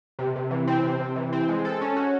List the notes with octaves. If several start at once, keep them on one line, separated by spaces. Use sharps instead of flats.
C3
C3
E3
C4
C3
C3
E3
C4
G#3
A4
C#4
F#4